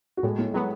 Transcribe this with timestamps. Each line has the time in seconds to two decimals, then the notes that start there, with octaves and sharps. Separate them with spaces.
0.17 F#4
0.23 A2 G#3 G#4
0.38 A2 A3
0.53 F#3 G#3 B3